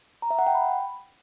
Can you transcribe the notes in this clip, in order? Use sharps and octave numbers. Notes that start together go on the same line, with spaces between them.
A#5
E5
F#5
G5
B5